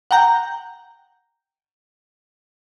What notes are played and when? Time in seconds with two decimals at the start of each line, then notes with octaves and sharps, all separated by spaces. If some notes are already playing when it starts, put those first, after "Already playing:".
0.11 F#5 G5 A#5 G6